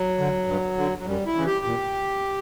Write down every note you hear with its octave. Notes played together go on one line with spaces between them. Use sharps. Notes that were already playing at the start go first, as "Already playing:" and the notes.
Already playing: F#3
D3
G2
D3
F#3
F#2 G3
E4
C#3 E3
G4
A#2